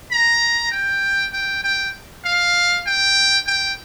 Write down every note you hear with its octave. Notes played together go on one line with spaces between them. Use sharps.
A#5
G5
G5
G5
F5
G5
G5